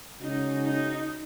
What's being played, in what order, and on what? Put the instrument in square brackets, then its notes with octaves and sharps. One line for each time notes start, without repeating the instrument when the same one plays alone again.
[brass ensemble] C#3 G#3 C#4 F#4 [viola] D#4
[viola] D#4